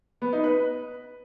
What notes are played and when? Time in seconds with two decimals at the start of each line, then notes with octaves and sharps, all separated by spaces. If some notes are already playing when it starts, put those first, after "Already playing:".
0.22 B3
0.33 D#4
0.44 B4